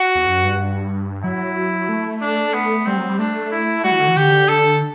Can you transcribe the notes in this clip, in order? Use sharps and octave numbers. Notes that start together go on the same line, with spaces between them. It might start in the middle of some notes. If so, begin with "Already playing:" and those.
Already playing: F#4
E2
F#2
G2
F#3 E4
A3
D4
B3
G3 C4
F#3
G3
A3 D4
E4
G3 F#4
E3
D3
E3
D3 G4
D3 A4